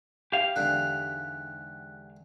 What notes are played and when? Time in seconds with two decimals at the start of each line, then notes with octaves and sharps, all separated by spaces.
0.32 G4 F5
0.56 E2 G#2 D3 F#6